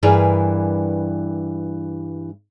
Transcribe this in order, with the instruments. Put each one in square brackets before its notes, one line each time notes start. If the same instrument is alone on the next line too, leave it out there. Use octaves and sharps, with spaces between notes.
[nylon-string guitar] G2 E3 G3 G#4 A#4 B4